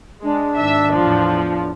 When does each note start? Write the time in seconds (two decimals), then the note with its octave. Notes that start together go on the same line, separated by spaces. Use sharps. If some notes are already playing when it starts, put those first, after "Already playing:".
0.23 G#3 D4
0.55 G#1 E5
0.95 E2 A2 F3